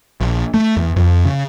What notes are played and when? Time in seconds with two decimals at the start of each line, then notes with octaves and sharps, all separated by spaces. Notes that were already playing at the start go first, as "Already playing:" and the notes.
0.21 A#1
0.54 A3
0.77 E2
0.96 F2
1.25 C#3